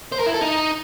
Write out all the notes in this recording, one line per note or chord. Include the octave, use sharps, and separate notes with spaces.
C5
A#4
E4
A4
D#4